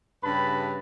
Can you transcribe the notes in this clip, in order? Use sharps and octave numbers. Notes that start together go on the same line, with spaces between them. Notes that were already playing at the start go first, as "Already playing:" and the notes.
G2 C#3 G4 B4 A5 B5